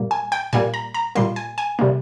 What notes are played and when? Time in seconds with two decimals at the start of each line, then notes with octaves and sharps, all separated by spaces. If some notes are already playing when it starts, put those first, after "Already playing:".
Already playing: A#2 G3 A#3
0.11 G#5
0.32 G5
0.53 A#2 G3 A#3 G#5
0.74 A#5
0.94 A#5
1.15 A#2 G3 A#3 C6
1.36 G#5
1.58 G#5
1.79 C3 G3 A#3